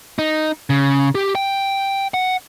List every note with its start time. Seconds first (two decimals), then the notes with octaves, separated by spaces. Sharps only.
0.19 D#4
0.70 C#3
1.15 G4
1.35 G5
2.14 F#5